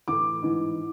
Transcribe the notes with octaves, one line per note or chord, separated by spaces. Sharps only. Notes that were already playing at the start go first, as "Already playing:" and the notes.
A2 E3 D6
G#2 E3